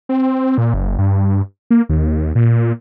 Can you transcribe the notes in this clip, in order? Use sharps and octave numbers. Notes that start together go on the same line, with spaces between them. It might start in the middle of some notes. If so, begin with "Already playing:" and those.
C4
A#2
F#1
G2
A#3
D#2
A#2